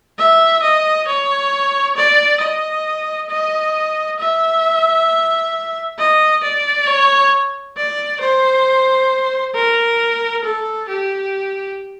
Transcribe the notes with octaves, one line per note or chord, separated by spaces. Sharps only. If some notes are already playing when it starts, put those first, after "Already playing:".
E5
D#5
C#5
D5
D#5
D#5
E5
D#5
D5
C#5
D5
C5
A#4
A4
G4